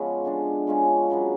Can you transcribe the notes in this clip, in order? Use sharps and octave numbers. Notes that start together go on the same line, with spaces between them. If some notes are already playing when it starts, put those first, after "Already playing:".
Already playing: C#3 F3 G#3 B3 C#4 F4
D3 G#3 D4
C#3 F3 G#3 C#4
C#3 F#3 B3 D4